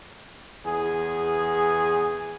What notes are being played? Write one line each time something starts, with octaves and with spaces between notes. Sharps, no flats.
E2 G#4